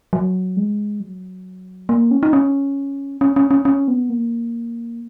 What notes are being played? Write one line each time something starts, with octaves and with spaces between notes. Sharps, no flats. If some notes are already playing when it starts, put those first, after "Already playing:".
F#3
G#3
F#3
A#3
C#4
D#4
C#4
C#4
C#4
C#4
C#4
B3
A#3